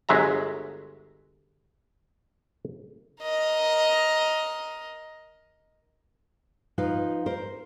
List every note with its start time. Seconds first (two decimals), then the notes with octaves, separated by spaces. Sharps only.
0.09 G1 F#3 G#3 E5 A#5
3.22 A#4 D#5
6.78 F3 D#4 F4 B4 F5
7.26 A#4 C5